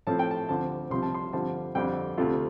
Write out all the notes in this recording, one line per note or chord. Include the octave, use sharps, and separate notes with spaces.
A2 F3 A3 C4 A5
G5
A5
D2 D3 F3 C4 A5
C2 C3 F3 C4 C6
A5
C6
G2 D3 F3 C4 A5
F2 D3 G3 C4 G5
D2 C3 A3 F4